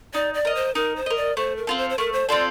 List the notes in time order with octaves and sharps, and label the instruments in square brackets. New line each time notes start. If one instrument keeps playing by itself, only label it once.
[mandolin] D#4 [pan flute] D5
[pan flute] D5
[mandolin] A#4 D#5
[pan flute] C5
[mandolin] D#4 [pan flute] A#4
[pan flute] C5
[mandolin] A#4 D#5
[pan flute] D5
[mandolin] A3 [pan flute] C5
[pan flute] A#4
[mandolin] C4 F4 A4
[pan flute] C5
C5
[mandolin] A3 [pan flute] A#4
[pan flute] C5
[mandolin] C4 F4 A4 [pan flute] D5